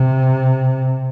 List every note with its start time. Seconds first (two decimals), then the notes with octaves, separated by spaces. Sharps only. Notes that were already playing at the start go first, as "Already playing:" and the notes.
Already playing: C3